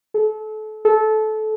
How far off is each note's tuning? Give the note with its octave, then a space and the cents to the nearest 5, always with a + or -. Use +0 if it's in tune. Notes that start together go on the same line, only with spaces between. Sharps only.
A4 -30
A4 -20